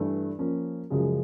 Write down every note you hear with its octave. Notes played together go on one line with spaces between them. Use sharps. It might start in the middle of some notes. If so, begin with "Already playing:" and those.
Already playing: G2 E3 A3
F3 A#3 C#4
F#2 C#3 F3 G#3